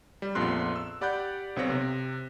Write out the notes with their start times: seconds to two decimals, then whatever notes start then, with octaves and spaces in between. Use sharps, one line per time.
0.22 G3
0.35 A#1 F2 B3 F4 C6 F#6
0.76 E6
1.01 G4 D5 F#5 B5 F#6 G6
1.56 B1 C4 B4 C#5 A#6
1.70 C3